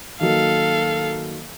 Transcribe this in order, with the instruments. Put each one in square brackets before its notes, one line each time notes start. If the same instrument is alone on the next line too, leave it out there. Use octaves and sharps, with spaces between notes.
[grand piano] D#3 F#3 A#3 [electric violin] A4 F5